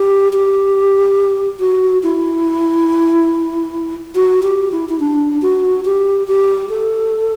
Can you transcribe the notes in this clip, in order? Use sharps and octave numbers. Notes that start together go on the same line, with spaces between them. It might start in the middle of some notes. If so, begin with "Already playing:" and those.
Already playing: G4
G4
F#4
E4
F#4
G4
E4
E4
D4
F#4
G4
G4
A4